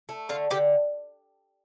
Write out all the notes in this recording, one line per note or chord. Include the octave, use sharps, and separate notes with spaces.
A3
D3 F4
D3 G4